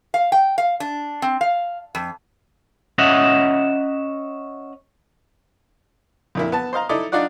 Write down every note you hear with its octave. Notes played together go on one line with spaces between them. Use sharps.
F5
G5
F5
D4
C4
F5
F2
C#4 D#5 E5 F#5
F2 A#2 E4
B3 A5
C5 D#5 F5 A#5
D#4 E4 A4 D5 D#5
D4 D#4 F4 D5 F#5